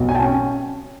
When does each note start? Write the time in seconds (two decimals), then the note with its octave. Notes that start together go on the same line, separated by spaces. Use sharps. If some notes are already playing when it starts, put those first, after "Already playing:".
Already playing: B1
0.09 G#5
0.15 G5 A5
0.22 C#4